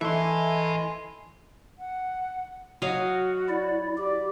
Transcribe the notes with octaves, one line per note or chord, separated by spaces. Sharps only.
E3 A3 E4 D#5 E5 G#5 C6
F#5
F#3 F#4 D#5 F5
E4 D5
G4 D5